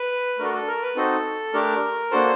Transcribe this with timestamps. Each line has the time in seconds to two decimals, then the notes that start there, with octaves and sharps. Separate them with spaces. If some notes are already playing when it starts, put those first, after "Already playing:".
Already playing: B4
0.39 A3 D4 F#4 A4 A#4
0.54 A4
0.68 A#4
0.82 B4
0.96 C4 D#4 F#4 A4
1.54 A3 D4 G4 A#4
2.11 A#3 D4 F#4 A4 C5